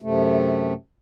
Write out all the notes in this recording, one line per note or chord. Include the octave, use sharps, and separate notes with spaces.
F#2 C3 A3